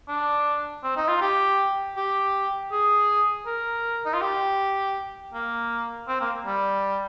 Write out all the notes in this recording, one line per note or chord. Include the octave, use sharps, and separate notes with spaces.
D4
C4
D#4
F4
G4
G4
G#4
A#4
D#4
F4
G4
A#3
C4
A#3
G3